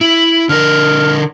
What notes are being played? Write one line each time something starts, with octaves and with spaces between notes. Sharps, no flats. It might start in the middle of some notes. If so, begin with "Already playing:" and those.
E4 F#7
D3 A#4 F6